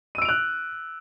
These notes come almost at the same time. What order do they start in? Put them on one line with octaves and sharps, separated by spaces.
D#7 E6 D7 F7 F#6